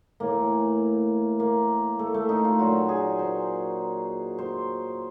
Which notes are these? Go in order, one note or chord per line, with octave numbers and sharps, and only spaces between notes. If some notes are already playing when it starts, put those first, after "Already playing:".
A2 E3 A#3
A#3
A3
A3
D#4
F4
A#2 F#3 F#4
G#4
C5
C5